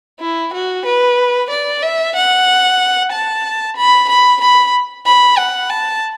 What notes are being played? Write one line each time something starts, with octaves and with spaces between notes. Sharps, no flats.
E4
F#4
B4
D5
E5
F#5
A5
B5
B5
B5
B5
F#5
A5